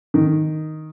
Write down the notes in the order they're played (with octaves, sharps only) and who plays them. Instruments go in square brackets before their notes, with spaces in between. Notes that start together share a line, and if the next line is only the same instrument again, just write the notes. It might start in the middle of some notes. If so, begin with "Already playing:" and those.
[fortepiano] D#3